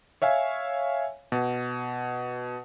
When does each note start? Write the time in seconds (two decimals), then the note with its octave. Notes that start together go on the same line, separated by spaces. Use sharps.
0.22 C#5 E5 F5 G#5
1.32 B2